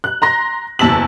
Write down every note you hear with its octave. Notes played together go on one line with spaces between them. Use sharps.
F#6
A#5 C6 A#6
F#1 E2 A5 E6 B6 F#7